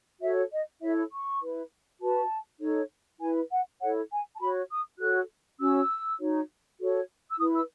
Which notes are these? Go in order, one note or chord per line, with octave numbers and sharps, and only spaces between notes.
F#4 A4 C#5 E5
D#5
E4 A4 C#5 E5
C#6
E4 B4
F#4 B4 A5
D#4 A4 C#5
E4 B4 G#5
F#5
E4 A4 C#5 F#5
G#5
A5
F#4 C#5 B5
D#6
F#4 A4 C#5 F#6
C#4 F#4 C#5 E6
D#4 F#4 C#5
F#4 A4 C#5
E6
E4 B4 D#6
E6